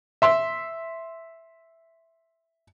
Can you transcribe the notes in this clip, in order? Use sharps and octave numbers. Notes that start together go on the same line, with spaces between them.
E5 C6